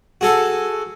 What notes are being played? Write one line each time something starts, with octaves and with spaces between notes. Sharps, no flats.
F#4 G#4 A4